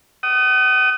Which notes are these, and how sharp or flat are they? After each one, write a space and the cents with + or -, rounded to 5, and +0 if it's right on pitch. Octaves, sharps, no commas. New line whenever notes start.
F#5 +40 D#6 +0